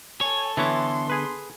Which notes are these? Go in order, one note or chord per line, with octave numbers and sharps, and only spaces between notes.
A4 C#5 G#5
D3 E3 B3 E4 C#5 C6
G#4 B4